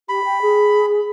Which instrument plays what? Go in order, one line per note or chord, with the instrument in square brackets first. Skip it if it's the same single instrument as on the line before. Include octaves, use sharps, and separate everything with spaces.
[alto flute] G4 [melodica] B5
[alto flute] G5
G#4